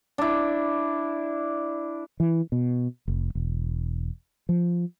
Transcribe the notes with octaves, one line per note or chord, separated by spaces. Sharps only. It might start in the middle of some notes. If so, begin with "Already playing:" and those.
D4 E4
E3
B2
F1
E1
F3